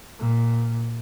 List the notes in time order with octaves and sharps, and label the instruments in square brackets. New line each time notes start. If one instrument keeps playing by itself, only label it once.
[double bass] A#2